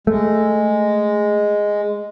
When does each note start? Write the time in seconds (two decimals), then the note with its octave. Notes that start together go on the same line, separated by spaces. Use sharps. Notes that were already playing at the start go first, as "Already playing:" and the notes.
0.07 G#3 A3